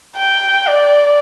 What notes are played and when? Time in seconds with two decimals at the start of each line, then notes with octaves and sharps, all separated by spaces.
0.17 G5
0.68 D5